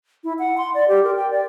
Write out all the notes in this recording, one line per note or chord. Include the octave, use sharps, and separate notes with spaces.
E4
F#5
C6
D5
G4
A#4
G5
D5